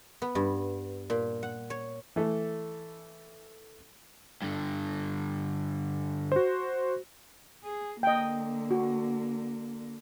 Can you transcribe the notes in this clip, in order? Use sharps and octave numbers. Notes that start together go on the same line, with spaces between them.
B3
G2
A#2
F#5
C#5
E3 A3
G2 D3
F#4 C5
G#4
D3 A#3 D#5 G5
F#4